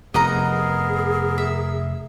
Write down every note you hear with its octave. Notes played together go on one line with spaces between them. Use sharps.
F1 B3 G#4 A#4 D#5 F#5 A#5
E5